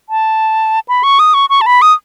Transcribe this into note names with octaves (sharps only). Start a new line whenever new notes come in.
A5
B5
C#6
D#6
C#6
C#6
A5
B5
D#6